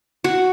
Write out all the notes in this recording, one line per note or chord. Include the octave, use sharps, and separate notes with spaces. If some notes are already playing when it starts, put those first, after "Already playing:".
F#4